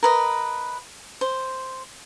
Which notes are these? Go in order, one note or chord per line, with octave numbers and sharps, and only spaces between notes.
A#4 B4 D#5
C5